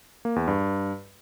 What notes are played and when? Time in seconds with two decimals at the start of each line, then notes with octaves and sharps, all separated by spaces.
0.25 A#3
0.36 E2
0.48 G2